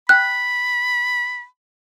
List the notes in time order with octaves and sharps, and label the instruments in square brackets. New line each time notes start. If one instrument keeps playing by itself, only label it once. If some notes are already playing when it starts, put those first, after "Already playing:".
[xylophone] G5 F#6 [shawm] B5